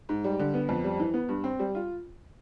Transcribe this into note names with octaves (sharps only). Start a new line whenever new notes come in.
G#2
G3
D3
B3
F2
G3
E3
B3
G2
C4
G3
F4